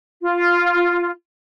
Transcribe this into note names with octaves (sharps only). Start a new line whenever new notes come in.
F4